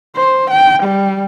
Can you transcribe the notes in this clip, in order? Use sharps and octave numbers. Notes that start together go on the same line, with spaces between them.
C5
G5
G3